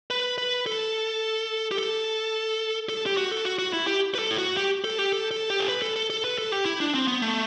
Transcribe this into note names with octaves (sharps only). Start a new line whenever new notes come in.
B4
B4
A4
G4
A4
A4
G4
F#4
A4
F#4
F#4
E4
G4
B4
A4
E4
F#4
G4
A4
G4
A4
A4
G4
A4
B4
A4
A4
A4
B4
A4
G4
E4
D4
C4
B3
A3